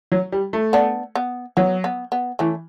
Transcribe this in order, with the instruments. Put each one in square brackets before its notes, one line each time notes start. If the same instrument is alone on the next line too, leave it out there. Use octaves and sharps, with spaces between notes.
[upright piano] F#3
G3
A3
[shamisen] B3 D4
B3
[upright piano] F#3 [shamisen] B3
[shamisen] B3
B3
[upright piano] E3 [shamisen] A3 C#4